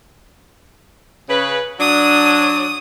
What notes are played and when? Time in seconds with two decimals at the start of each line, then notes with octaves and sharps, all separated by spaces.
1.29 C#3 B4
1.80 F#3 D4 D#6